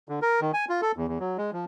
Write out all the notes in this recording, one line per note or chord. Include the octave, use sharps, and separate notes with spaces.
D3
A#4
D#3
G#5
F4
A4
E2
E2
F#3
G#3
F3